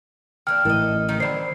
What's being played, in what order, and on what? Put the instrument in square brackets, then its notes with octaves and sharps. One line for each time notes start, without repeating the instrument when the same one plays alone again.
[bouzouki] D#3 A#3 D4 [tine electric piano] G5 F#6 [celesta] F6
[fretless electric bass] A1 A2 E3 [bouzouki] A4 D#5 [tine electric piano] A#4
[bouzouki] D#3 D#4 G4
[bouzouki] D3 F#3 [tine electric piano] C5 D5 B5 [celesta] C7